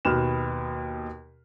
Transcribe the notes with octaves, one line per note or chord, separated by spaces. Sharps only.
D#2 B2 B4 F6 E7